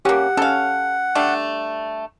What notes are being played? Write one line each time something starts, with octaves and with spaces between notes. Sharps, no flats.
A#3 C#4 G4 F#5
C#4 A4 F5
G3 A3 D4